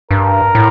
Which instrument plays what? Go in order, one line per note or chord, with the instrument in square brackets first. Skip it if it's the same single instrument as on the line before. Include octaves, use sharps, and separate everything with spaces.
[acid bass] G2 [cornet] A#4
[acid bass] A2